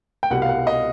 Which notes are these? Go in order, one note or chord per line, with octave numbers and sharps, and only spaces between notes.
G5
C2 B2 G3 F#5
F5
F#5
D#5